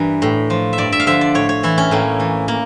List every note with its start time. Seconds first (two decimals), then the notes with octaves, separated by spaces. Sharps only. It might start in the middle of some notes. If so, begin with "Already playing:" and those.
Already playing: G2 E3 A#4
0.22 A2
0.50 F3
0.73 E5
0.78 G2 D5
0.92 E5
1.00 F5
1.06 D3 F3 E5
1.21 D5
1.35 A2 C#5
1.49 C#5
1.63 E3 E4
1.78 C#4
1.91 A2 A#3
2.20 E3
2.48 A#3